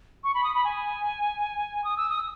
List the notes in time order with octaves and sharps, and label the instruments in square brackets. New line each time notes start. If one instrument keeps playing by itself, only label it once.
[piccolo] C#6
B5
D#6
B5
G#5
D#6
E6
D#6